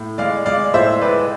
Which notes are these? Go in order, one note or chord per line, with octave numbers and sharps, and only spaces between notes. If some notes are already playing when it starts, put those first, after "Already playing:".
Already playing: A2
G#3 D5 F5
G#3 D5 F5
A2 C5 E5
G#3 B4 D5